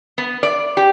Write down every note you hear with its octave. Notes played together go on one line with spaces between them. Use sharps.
B3
D5
G4